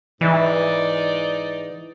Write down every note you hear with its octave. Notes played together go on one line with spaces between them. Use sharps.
G#2 E3 D#4 D5